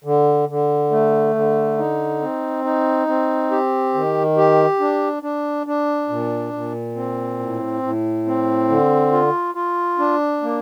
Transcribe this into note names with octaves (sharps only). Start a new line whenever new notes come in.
D3
D3
A3
D3
D#4
C4
D#4
C4
G4
D#3
G4
D4
D4
D4
A#2
A#2
C4
A2
A2
C4
D3
F4
F4
D4
A#3